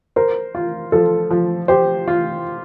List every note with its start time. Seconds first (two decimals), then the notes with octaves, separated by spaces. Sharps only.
0.16 A#4 C5
0.55 F4
0.92 F3 A4
1.31 F3
1.68 G4 C5
2.08 F4